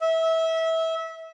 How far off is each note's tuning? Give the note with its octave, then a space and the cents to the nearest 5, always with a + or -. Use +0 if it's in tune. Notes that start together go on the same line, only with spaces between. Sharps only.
E5 -20